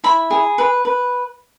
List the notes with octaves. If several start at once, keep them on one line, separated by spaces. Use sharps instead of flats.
E4 B5
G#4
B4
B4